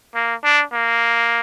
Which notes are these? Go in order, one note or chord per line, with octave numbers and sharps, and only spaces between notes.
A#3
D4
A#3